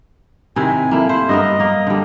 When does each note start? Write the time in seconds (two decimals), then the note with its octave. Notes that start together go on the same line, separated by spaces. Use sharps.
0.56 C3 D#3 E4 G#5
0.91 A3 A#3 E4
1.09 E4 C5
1.29 G2 B3 A#4 D#5
1.60 A#3 F5
1.87 D3 G3